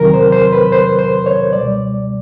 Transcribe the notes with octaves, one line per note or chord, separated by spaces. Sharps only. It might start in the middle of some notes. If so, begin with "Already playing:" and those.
Already playing: E2 C3 D#3 F#3 A#4
C5
C5
B4
C5
C5
C#5
C#2 B2 G3 D5